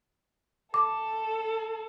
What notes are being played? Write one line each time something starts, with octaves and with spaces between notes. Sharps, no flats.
A4 D6